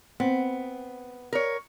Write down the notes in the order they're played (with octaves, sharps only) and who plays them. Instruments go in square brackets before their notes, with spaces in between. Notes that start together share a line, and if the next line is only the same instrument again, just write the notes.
[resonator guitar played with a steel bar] B3 [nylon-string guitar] C4
[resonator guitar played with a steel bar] A#4 C#5